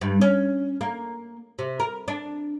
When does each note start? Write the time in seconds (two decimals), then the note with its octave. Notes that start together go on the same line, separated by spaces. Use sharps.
0.01 G2
0.21 C#4
0.81 A#3
1.59 C3
1.80 A#4
2.08 D4